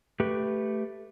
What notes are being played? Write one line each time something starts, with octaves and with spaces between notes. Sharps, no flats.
A3 G4 B4